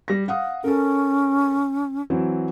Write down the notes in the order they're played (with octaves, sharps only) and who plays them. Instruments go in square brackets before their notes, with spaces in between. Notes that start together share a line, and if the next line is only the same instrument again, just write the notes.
[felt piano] G3 A#6
F5 F#5 D#6
[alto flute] C#4 [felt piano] A4 A#4
[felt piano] E3 F#3 C4